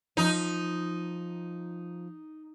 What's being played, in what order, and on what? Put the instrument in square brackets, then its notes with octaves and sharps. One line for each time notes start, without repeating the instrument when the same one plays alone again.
[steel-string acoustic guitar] F3 [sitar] D#4